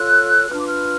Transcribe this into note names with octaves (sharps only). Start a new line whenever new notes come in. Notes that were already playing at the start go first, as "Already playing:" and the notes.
Already playing: F4 A4 C#5 F#6
D4 F4 B4 F6
D6
F6